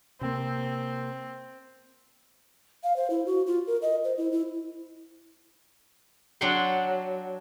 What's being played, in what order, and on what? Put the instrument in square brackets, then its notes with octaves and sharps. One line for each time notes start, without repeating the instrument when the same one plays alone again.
[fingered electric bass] C3 A#3 [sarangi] C4
[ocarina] F5
C5
E4
F#4
F4
A#4
D#5
C5
E4
E4
[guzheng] F#3 D4 F#5 G5 C6